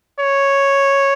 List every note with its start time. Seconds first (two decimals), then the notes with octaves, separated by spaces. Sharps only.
0.20 C#5